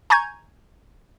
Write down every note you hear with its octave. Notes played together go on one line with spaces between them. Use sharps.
G#5 A#5 C#6 G6 G#6